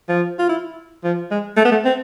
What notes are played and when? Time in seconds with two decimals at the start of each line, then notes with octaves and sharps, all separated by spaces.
0.09 F3
0.39 F4
0.49 E4
1.04 F3
1.31 G#3
1.57 A3
1.65 B3
1.72 A3
1.85 C4